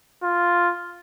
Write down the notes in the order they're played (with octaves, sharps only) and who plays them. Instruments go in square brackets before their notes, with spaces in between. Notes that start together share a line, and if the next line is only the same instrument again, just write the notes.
[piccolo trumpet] F4